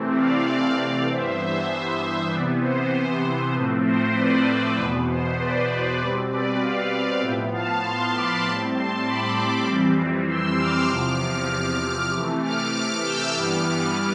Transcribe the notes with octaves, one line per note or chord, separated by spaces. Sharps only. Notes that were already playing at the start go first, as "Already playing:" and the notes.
Already playing: C3 E3 A3 C4
D5 F5
G2 E3 B3 C5 E5
C5 E5
C3 E3 B3 B4 D5
C5
A2 F3 A3 C4 B4
C5
B4 D5
E2 B2 B3 B4
C5
B4 D5
B2 G3 C4 B4 D5
B4 D5
D5 F5
A2 F3 B3 E5 G5
F5 A5
A5 C6
B5 D6
A2 G3 C4 A5 C6
A5 C6
B5 D6
B5 D6
F2 E3 G3 C4
C6 E6
D6 F6
E2 C3 F3 D6 F6
D6 F6
C3 E3 A3
D6 F6
D6 F6
E6 G6
G2 E3 G3 B3 D6 F6